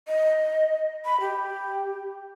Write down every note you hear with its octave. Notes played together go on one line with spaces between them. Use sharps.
D#5
B5
G4